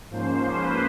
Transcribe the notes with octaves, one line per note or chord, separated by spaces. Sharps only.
G#2 F3 A#3 C#4 C5
B4